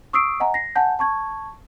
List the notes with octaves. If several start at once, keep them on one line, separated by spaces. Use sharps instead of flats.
C#6 D#6 E6 C7 D7
D#5 F#5 G#5 A#5
A#6 C7
F#5 G#5 A5 G6
A5 C#6 G#6